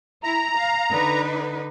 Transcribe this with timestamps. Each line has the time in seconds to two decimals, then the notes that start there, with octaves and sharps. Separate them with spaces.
0.24 E4 A#5
0.57 F5
0.91 D3 D#4 B4